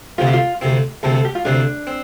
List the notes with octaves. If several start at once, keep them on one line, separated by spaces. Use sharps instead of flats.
D2 C3 F3 C4 F4
G4
F4
D2 C3 F3 C4
D2 C3 F3 C4 A4
A4
G4
F4
D2 C3 F3 C4 D4
C4